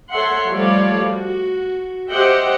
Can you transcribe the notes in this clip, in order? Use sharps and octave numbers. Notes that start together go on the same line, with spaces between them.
A4 C#5 E5 F#5 C6
F3 G3 A3 C#5 D5 F5
F#4
G4 C5 D#5 E5 F#5 G5